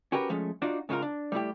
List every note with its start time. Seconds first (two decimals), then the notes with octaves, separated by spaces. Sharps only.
0.12 C#4 F#4 G4 A#4 B4
0.29 F3 G#3 A3 C#4
0.62 D4 D#4 F4 F#4 D5
0.89 G#2 C#3 G#3 D#4 F4 A#4
1.02 D4
1.32 G3 A3 E4 G4